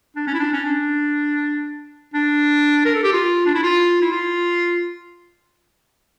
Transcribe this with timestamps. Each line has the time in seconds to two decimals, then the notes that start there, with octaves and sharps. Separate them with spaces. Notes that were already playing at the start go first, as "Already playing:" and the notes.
0.16 D4
0.27 C#4
0.34 E4
0.40 D4
0.53 C#4
0.65 D4
2.14 D4
2.86 A#4
2.95 A4
3.04 G4
3.13 F4
3.46 D4
3.55 E4
3.63 F4
4.02 E4
4.12 F4